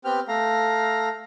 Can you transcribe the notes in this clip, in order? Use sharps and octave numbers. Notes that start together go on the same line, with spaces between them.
B3 C4 G4 G5 F6
A3 F5 A#5